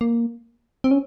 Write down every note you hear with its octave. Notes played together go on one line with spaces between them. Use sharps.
A#3
C4
C#4